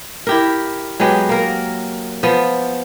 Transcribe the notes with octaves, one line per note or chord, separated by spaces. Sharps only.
E4 G4 A#4
F#3 G#3 B3 G4
A#3 A#4
F3 B3